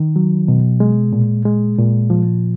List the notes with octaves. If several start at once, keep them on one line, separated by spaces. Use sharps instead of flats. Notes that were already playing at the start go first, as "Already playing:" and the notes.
Already playing: D#3
F#3
B2
G#3
A#2
G#3
A#2
F3